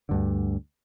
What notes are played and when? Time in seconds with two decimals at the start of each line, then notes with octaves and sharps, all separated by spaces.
0.09 D2 G2 D3